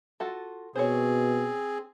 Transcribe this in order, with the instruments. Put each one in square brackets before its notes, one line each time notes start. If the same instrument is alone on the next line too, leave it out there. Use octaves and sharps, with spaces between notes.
[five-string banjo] F4 F#4 A4
[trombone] B2 [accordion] C4 G#4 [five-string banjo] C5 C#5